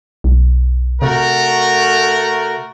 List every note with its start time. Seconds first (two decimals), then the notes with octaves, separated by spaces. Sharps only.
0.24 B1
1.02 C3 A3 F#4 A#4